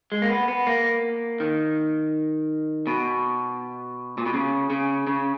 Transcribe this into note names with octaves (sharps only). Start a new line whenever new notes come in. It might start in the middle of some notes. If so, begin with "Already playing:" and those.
G#3
A#3
B3
B3
A#3
D#3
B2
A#2
B2
C#3
C#3
C#3